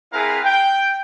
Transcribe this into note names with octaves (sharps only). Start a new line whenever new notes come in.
C4 E4 G#4 A#4 B4 F5
G5